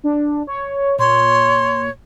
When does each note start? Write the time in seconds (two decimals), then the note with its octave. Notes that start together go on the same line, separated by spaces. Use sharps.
0.04 D4
0.47 C#5
0.99 A#2 C#5 C6